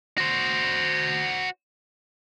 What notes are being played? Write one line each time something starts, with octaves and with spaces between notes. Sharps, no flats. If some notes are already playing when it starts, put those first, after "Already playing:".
F#4 C5